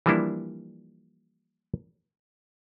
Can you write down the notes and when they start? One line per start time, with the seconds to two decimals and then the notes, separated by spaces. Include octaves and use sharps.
0.06 E3 F3 G3 A#3 D4 E4